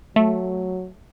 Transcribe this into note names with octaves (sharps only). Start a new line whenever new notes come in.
F#3 A3